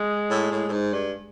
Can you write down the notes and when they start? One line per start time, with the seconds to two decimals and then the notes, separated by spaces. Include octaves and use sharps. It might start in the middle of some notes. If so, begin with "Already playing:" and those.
Already playing: G#3
0.30 A2
0.51 A2
0.68 A2
0.72 G#2
0.93 G2